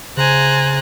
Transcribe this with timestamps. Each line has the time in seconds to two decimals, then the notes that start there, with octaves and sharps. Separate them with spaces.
0.17 C#3 C5 G#5 A#5 F#6